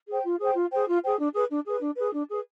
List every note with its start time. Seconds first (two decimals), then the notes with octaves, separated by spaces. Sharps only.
0.08 G#4 C5 G5
0.25 F4
0.40 G#4 C5 G5
0.55 F4
0.71 G#4 C5 G5
0.87 F4
1.03 G#4 C5 G5
1.19 D4
1.34 G#4 B4
1.49 D4
1.66 G#4 B4
1.81 D4
1.97 G#4 B4
2.12 D4
2.29 G#4 B4